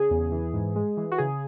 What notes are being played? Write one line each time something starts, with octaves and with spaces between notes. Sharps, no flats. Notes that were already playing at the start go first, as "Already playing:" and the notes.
Already playing: C#3 G#4
E2
E3
G#2
G#3
E3
F#4
C#3 G#4